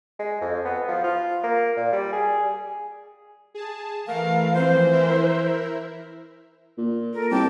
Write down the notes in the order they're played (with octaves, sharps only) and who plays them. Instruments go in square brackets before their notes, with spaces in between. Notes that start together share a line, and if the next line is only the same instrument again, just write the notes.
[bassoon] G#3
F2
B3
F3
F4
A#3
A#2
G3
G#4
[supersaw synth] G#4 A5
[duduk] E3 [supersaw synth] A3 A#4 [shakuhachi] F5
[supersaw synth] F3 C4 [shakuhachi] C5
[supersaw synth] E4 A#4 E5
[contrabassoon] A#2
[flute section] A4 A#4
[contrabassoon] C2 [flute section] G5 A5 D6